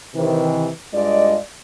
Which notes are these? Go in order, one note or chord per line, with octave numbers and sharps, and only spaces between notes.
C3 D#3 E3
G2 G#3 F4 D5 D#5